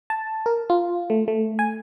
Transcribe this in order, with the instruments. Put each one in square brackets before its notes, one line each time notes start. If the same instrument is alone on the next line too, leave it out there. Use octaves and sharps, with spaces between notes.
[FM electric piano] A5
A#4
F4
A3
A3
G#5